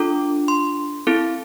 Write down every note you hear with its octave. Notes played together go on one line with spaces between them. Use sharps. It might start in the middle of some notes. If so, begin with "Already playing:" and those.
Already playing: D4 F4 A4 D6
C6
C4 E4 A4